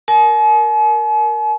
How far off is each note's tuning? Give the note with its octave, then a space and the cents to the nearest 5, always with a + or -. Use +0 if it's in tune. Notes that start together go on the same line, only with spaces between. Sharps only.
A#4 +0 G#5 +45